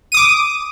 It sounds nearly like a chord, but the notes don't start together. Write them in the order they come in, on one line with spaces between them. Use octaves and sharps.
D#7 D#6 D6